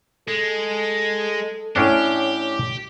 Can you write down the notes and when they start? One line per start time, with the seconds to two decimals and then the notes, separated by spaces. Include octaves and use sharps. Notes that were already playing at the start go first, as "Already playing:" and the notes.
0.28 G#3 A4
1.76 A2 C#4 D4 G4